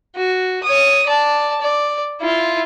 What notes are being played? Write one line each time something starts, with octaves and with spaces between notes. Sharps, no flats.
F#4
C#5 D#6
D5 A5
D5
E4 F4